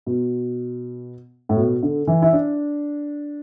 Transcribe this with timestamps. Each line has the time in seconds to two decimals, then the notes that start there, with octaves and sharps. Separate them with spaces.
0.06 B2
1.49 A2
1.57 B2
1.83 D3
2.07 E3
2.22 E4
2.33 D4